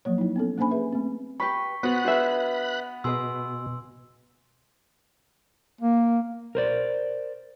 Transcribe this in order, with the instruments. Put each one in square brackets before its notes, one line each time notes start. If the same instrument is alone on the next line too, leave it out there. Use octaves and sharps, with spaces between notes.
[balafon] F3 F#3 A#3 C#5
D#4 E4
B3 C#4 A4
A#3 C#4 D4 C5 G#5 B5
G#4 B4 E5
A3 C4
[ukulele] G4 B4 B5 [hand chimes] C#6 B6
[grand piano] B3 [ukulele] F#4 C5 [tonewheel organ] B5 F#6
[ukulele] D4 G#4 E5 [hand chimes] F#4 B4
[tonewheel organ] B2 [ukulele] G#4 B4 D#5 [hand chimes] G#5 C6 E6
[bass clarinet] A#3
[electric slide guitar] A#4 C5 D5